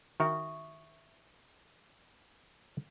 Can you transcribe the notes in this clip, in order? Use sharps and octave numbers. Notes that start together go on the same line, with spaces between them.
D#3 F#4 A#4 E5 C#6 D#6